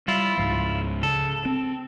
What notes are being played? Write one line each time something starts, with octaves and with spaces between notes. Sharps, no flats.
G3 E4 F4
C#2 G#2 F3
C#3 A4
C4